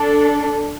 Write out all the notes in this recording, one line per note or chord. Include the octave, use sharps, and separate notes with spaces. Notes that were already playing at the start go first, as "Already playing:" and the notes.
Already playing: D4 A4